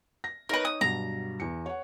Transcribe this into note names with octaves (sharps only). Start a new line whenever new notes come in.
A#6
D#4 A#4 B4 C#5 D#5
D#6
G2 B2 F#3 A#5
E2 C#7
C#5 F#5